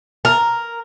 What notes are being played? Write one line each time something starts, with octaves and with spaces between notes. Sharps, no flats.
A#4